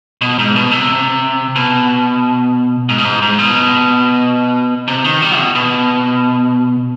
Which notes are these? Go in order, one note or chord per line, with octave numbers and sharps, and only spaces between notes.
B2
G#2
B2
C3
B2
G#2
B2
G#2
G#2
B2
C3
D#3
G3
B2
B2